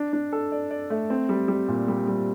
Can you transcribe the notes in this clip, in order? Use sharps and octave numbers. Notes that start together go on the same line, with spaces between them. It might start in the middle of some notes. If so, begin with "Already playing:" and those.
Already playing: D4
D4
A4
D5
D5
A3
C4
G3
G3
A#2
G3
G3